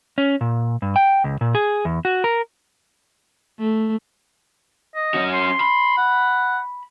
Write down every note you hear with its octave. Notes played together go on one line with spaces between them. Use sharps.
C#4
A#2
G2
G5
C#2
A#2
G#4
E2
F#4
A#4
A3
D#5
C#4 F#4
C6
B5
F#5